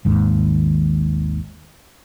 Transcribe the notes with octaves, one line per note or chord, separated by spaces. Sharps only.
G#1 D#2 G#2